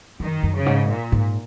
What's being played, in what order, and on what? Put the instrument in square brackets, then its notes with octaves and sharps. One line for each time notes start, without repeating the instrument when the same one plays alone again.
[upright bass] F#2 [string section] D#3
[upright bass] F#2
[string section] C#3
[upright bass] G#2
[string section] A#2
[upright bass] G#2